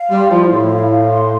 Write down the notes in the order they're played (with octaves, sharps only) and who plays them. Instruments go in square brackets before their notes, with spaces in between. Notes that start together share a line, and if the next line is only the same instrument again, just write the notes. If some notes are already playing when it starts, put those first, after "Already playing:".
Already playing: [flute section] F5
[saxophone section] G3 [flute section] C6
[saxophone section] F3 [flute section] E4
[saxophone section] A2 [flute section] E4
[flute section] F5
F5
C6